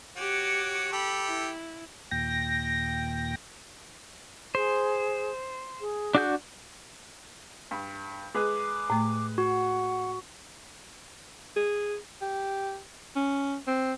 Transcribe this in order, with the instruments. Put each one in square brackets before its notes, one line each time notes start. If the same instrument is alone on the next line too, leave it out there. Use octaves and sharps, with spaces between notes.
[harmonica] F#4 C#5 [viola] G4 D6
[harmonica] G4 A4 [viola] B5
[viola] E4
[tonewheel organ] D#2 A#2 G5 A#6
[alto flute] G#4 [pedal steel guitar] C5
[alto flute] G#4
[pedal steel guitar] D4 F#4 G6
[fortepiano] G2
[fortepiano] G#3 G#4 B4 [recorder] D6
[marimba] A2 A3
[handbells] F#4 [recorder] F#5
[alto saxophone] G#4
G4
C#4
C4